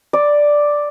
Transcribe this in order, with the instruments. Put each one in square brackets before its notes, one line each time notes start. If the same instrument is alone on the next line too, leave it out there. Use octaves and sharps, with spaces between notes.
[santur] D5